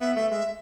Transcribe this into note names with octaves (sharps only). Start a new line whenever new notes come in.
B3 E5
A3 E5
G#3 E5